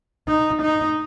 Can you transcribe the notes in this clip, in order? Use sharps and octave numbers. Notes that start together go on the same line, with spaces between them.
D#4
D#4